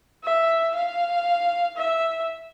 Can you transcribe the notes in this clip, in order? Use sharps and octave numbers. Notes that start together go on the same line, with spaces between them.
E5
F5
E5